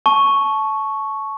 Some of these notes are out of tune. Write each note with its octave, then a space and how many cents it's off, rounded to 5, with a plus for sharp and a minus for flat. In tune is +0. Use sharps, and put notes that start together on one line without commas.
A5 -15 C#6 +0